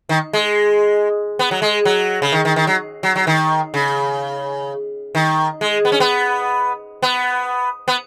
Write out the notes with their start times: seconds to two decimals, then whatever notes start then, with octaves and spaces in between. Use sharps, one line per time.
0.09 D#3
0.33 G#3
1.39 B3
1.51 F#3
1.62 G#3
1.85 F#3
2.22 C#3
2.33 D#3
2.45 D#3
2.56 D#3
2.67 F#3
3.03 F#3
3.16 F#3
3.27 D#3
3.74 C#3
5.15 D#3
5.61 G#3
5.85 B3
5.92 C#4
6.00 B3
7.02 B3
7.88 B3